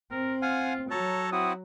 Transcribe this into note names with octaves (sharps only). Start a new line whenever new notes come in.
C4 A#4
F4 F5 F#5 G#5
F#3 A4 C#5 A5 A#5
C4 E4 F#4 D#6